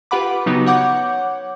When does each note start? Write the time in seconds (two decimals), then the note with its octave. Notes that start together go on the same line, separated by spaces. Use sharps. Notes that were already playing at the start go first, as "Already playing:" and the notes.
0.11 F4 G4 B4 F#5 B5 D6
0.46 C#3 F#3 B3 D#4 F#4 G4
0.66 C#5 F#5 D6 G6